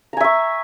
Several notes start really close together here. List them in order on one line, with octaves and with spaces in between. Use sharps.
A#5 G#5 E5 C#6